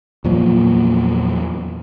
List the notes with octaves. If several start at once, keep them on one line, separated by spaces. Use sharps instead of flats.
E2 A#2 F3 F#3 A#3